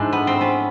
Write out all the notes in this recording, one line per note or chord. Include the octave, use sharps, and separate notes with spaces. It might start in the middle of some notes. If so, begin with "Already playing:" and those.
Already playing: G#2 F3 G#3 D4 E4
B3
C4
B3 C#4